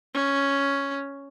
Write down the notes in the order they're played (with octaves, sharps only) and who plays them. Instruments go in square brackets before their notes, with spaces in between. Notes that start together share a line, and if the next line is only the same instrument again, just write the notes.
[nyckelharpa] C#4